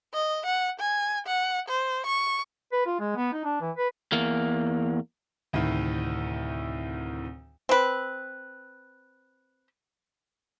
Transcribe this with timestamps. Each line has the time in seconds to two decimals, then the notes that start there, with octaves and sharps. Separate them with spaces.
0.14 D#5
0.46 F#5
0.80 G#5
1.27 F#5
1.68 C5
2.06 C#6
2.72 B4
2.86 F4
3.00 G#3
3.16 B3
3.33 D#4
3.44 D4
3.61 E3
3.77 B4
4.12 E2 A#3
5.53 D2 A2 C3 D#3
7.69 C4 B4